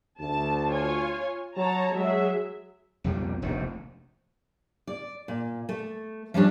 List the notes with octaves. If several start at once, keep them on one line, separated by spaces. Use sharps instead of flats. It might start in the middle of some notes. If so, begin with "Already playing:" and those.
D2 A5
F4 C#5 G#5
F#3 C#5 A5 A#5
F#3 G#3 G#4 E5
B1 F2 A#2 G3
F1 A#1 D#2 G#2
D5
A#2
A3
F3 G3 C#4 D4